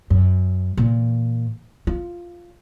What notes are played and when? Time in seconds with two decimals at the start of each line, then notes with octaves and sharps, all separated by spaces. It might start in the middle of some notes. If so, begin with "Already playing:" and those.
0.10 F#2
0.77 A#2 E3
1.87 F4